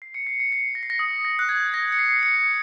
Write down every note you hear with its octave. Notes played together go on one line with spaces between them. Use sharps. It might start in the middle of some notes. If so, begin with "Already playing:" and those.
C7
C#7
C7
C#7
C7
A#6
C7
A#6
D#6
A#6
F#6
G#6
A#6
C#7
C7
C#7